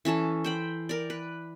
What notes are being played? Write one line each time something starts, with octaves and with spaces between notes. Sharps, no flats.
E3 C#4 A4 A5
C5 G5 B5
A#4 D5
B4